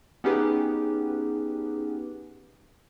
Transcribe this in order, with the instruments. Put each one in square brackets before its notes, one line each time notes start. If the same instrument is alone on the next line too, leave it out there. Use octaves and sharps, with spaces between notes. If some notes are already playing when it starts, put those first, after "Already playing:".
[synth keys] B3 C#4 D#4 G4 G#4 B4